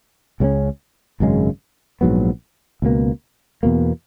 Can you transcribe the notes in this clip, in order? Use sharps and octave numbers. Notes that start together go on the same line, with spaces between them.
C#2 C#3 F#3 C#4
G#1 F#2 C#3 G#3
A#1 G#2 F#3 B3
C#2 B2 A#3
E2 B2 A#3